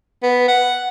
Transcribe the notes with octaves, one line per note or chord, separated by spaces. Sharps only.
B3
F#5